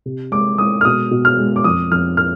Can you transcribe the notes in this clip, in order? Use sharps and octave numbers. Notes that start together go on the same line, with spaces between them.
C3
G#3 D6
G#3 D#6
F6
B2 D#6
B2
F6
G#3
D6
F2 D#6
F2 F6
F6